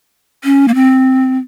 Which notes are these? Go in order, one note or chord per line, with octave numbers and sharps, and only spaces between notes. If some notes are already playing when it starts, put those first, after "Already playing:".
C#4
A#3
C4